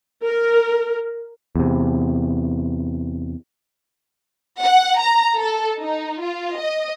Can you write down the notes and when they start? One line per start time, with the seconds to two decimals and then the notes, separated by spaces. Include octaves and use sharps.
0.25 A#4
1.56 E2 C3
4.63 F#5
5.02 A#5
5.38 A4
5.82 D#4
6.24 F4
6.59 D#5